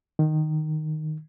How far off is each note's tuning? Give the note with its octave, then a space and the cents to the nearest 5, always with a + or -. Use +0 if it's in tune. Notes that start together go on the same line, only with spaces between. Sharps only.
D#3 -10